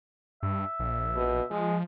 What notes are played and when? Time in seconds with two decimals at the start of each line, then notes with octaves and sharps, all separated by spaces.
0.43 G2 E5
0.80 A#1
1.16 B2
1.51 F3 G#3